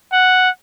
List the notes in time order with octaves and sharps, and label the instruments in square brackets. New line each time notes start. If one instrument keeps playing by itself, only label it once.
[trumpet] F#5